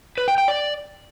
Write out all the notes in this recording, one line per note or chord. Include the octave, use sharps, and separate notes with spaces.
B4
G5
G5
D5